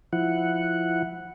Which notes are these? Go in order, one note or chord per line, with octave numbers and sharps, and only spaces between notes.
F3 E4 F#5